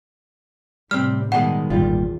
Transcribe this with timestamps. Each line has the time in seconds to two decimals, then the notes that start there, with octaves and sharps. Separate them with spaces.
0.91 A2 C3 G3 C4 F6
1.32 B2 D#3 G3 G#3 F#5
1.70 G#1 E2 A#2 G3 F4